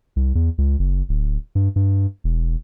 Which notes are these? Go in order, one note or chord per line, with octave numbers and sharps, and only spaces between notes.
C2
E2
C#2
F#1
D1
G2
G2
E1